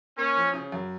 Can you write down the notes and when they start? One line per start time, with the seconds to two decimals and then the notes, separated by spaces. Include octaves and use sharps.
0.17 A#3 C#4
0.36 F3
0.54 C#3
0.72 F#2